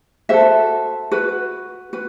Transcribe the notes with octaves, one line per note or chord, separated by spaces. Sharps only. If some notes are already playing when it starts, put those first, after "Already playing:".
F#4 A4 C5 E5
F#4 B4
F#4 B4